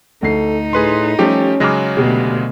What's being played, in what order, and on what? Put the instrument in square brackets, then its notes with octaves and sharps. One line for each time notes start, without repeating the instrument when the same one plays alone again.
[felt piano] D2 C7 [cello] D#4 [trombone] A4
[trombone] A2 [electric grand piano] G#4 B4 C6
[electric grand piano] F3 A3 G4 [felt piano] G3 [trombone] C#4
[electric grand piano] C#3 F#3 G#3 [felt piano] D6 F6 A#6
[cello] D2 B2 [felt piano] G4